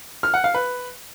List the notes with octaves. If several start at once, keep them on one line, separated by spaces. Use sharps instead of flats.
F6
F#5
F5
B4